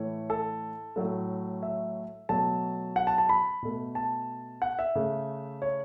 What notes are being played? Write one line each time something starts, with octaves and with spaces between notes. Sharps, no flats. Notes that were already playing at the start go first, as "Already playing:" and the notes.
Already playing: A2 E3 A3 C#5
A4
A2 F#3 A3
E5
B2 F#3 A3 A5
F#5
A5
A5
B5
B2 A3
A5
F#5
E5
C#3 A3
C#5